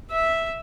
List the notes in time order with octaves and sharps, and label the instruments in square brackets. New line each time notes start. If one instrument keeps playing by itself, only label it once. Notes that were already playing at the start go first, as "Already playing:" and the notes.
[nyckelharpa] E5